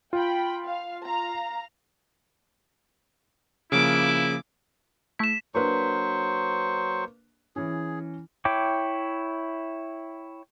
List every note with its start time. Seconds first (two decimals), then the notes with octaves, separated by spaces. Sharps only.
0.13 F4 G5 B5
0.64 F5
1.05 F5 A#5
3.72 C#3 F3 A#3 E4 D6
5.19 A3 E4 B6 E7
5.55 F#3 A#3 D4 B4 C5 C#6
7.56 E3 C#4 G#4
8.45 E4 C#5 G5 D6